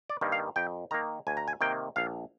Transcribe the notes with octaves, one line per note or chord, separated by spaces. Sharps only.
D5
G2 D#3 G3 A#3
F5
F2 G5
D#3 A#3 A#5
D2 G#5
A#5
G#5
C3 D#3 A#3 G5
A#1 F5